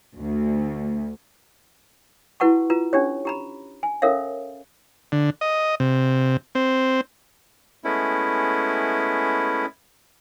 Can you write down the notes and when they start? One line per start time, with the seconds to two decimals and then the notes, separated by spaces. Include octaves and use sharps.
0.16 D2
2.40 E4 F#4 B4 F#5 A5 C#6
2.70 F4 B4 A#5
2.93 C#4 D4 G4 C#5
3.25 G4 A#5 B5
3.83 G#5
4.02 C#4 A4 A#4 C#5 E5 F5
5.12 D3
5.41 D#5
5.80 C3
6.55 C4
7.84 G#3 A3 B3 C#4 E4